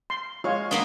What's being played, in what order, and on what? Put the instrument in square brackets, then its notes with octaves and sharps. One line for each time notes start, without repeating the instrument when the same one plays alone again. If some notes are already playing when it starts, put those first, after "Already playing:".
[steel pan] C6
[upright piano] G#3 F5 C#6 [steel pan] F4 C#5
[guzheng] A#3 B3 D4 [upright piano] D#6 G7